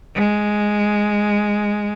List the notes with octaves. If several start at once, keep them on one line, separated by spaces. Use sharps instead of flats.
G#3